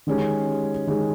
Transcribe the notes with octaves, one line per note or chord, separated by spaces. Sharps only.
D#3 G#3 C#4 G4
D#3 G#3 C#4 G4